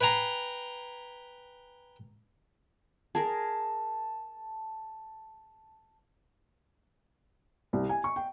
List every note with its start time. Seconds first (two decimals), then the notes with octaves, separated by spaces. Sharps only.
0.01 B4 G5 G#5 A#5 C6
3.15 G#4 A#4 A5
7.73 C2
7.89 G#5
8.04 C#6
8.16 G5